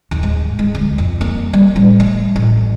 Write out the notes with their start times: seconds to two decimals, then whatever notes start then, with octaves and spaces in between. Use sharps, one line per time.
0.11 D#2
0.23 G#2
0.59 G#3
0.74 D2
0.98 F2
1.21 A#3
1.53 G3
1.76 A1
2.00 A3
2.36 A1